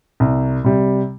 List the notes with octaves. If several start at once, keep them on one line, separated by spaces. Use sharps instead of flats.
C2
C3 G3